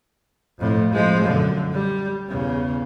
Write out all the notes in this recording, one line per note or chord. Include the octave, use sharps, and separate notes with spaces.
F2 A2
F3 G#3
F#2 D3
G3
E2 C#3